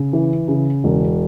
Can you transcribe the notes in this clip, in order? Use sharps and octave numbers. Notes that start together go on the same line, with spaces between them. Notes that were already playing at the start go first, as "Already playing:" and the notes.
Already playing: C#3
E3
C#3
E1